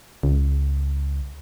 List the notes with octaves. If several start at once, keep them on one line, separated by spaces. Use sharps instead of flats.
C#2